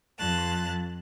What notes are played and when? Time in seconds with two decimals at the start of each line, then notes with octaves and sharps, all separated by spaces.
0.19 F2 A5 F#6